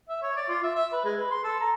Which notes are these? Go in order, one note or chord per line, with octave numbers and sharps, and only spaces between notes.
E5
C#5
D5
F4
E5
E5
B4
G#3
B4
C6
A4
A#5